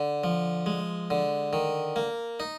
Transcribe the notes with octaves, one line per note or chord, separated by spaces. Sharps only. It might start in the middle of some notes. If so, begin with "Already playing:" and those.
Already playing: D3
F3
G#3
D3
D#3
A#3
D#4